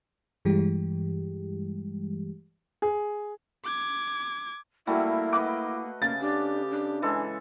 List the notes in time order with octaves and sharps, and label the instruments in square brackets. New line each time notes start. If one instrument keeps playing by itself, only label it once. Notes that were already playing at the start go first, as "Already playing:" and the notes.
[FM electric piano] G2 E3 G3 G#3 G4
[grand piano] G#4
[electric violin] D6 G#6
[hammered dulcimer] G3 A3 F#4 [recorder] A#3 [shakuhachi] E4
[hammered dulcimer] B4 D#5 F#5 [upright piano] D6
[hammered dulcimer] C#3 [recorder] A#3 [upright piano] A6
[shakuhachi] D4 [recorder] G4
[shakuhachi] D4
[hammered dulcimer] E3 G#3 A4